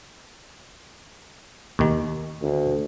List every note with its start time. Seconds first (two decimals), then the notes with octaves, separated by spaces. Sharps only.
1.79 D#2 D#3
2.42 D2